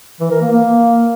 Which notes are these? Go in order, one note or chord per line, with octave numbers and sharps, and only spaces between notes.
E3
A#4
A#3
A#3